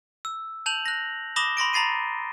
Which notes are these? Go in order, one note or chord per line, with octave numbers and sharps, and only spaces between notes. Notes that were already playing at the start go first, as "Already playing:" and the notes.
E6
A5 G6 F7 F#7
F#6 A#6
B5 D6 D#6 A#6 E7 G7
B5 C6 A#6 D7
A#5 B5 A6 C7 D#7